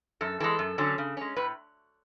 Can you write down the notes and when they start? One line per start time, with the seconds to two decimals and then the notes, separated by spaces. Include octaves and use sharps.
0.21 F#2 A4
0.40 E3 G#3 A4
0.59 F#2
0.78 D3 F#3 C#4
0.98 C#3
1.17 G#3 C#4
1.36 A2 B4